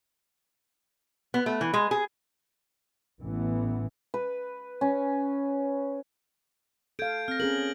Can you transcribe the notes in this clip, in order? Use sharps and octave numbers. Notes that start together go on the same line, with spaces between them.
B3
A3
E3
G#3
G#4
A1 E3 B3
B4
C#4
A4 F5 G6 G#6 D7
C4 F6 A#6
C#4 G#4 A#4 F#7